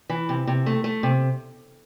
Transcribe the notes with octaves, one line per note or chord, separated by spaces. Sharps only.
E3
C3
C3
A3
A3
C3